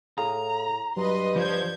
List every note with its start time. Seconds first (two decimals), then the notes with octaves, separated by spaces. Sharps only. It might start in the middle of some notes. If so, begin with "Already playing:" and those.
0.18 A2 G#4 F5 A#5 D#6
0.97 G2 F#3 B4 D#5 C6
1.36 F3 F4 B4 D5 G6 G#6